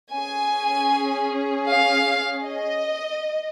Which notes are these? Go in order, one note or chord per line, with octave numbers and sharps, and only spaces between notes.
C#4 G#4 G#5
F5
D#5